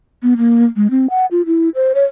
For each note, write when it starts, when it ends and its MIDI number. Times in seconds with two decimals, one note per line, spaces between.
0.23 0.34 59
0.38 0.65 58
0.76 0.90 56
0.91 1.07 60
1.10 1.26 78
1.31 1.45 65
1.46 1.69 64
1.75 1.92 72
1.95 2.04 73